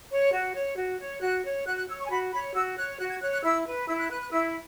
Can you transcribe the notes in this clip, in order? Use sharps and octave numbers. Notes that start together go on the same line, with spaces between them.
C#5
F#4
C#5
F#4
C#5
F#4 F#6
C#5
F#4 F#6
F#6
C#5 E6
C#6
G#5
F#4 B5
C#5 B5
F#4 E6
C#5 F#6
F#4 F#6
G#6
C#5 F#6
F#6
E4 E6
B4
E4 E6
F#6
B4 F#6
F#6
E4 E6